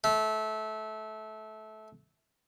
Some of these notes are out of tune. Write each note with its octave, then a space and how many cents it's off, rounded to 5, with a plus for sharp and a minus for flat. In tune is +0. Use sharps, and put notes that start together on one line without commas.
A3 -20